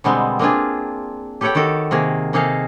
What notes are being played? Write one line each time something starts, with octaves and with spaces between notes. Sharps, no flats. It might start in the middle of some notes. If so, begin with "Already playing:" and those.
B2 D3 G3 G#3 B3 C4
A#3 C4 D4 F4 G#4
G4 A4 B4 C#5 F#5 G5
D#3 F#4 G4 A4
C3 D#3 A#3 G#4
C3 A#3 D#4 G#4 A4 F5